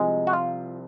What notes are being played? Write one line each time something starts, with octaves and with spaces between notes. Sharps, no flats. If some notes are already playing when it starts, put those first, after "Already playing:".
Already playing: C2 C3 F3 G#3 C4
F#4
F4